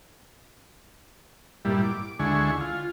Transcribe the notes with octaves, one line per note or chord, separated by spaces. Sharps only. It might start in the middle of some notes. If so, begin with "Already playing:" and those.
G2 A#2 G3 E4
D6
D2 D3 G#3 E4 G#5 C#6
F4